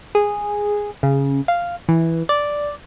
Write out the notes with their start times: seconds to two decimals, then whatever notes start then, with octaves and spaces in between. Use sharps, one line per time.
0.15 G#4
1.03 C#3
1.48 F5
1.89 E3
2.29 D5